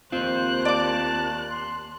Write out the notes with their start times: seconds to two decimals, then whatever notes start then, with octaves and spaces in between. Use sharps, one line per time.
0.12 D#2 C4 F4 C5 F#6
0.65 D5 A5 D6
1.50 C6